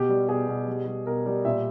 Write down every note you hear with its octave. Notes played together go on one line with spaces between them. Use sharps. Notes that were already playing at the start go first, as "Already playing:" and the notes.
Already playing: B2 G4
G3
B2 G#4
B2
G3
G3
B2 A#4
G3
A#2 E5